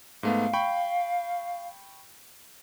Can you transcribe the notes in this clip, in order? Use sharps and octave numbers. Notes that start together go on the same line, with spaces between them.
G#2 A3 B3 F5
G5 B5 C#6